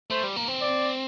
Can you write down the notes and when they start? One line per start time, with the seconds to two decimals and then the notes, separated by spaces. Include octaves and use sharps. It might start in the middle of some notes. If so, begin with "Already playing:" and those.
0.10 A3 C5
0.23 G3
0.36 A#3
0.48 C4
0.61 D5